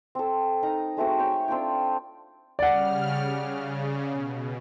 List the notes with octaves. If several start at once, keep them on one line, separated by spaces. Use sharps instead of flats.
C4 A4
D#4 A#4 A#5
G#3 A3 C4 F#4
C#5 G5 C#6
C4 D4 F4 G5
C#3 G3 D5 F#5 F6
C#3
B2